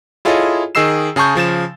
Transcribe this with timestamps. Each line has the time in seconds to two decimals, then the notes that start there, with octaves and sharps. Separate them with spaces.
0.25 E4 F4 G#4 A4 C#5 D#5
0.75 D#3 G#4 D#5 E6 C7 E7
1.16 C#3 G#4 A5 C#6 G6
1.35 C#3 F3 A6 E7